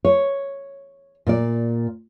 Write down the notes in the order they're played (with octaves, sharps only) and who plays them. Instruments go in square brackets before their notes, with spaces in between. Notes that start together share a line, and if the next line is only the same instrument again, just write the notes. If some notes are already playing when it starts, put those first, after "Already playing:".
[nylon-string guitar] C#5
A#2 D5